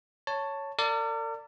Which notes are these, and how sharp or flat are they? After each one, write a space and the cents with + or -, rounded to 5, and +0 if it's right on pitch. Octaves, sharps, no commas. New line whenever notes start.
C#5 +0 A5 +10
A#4 -45 D5 -5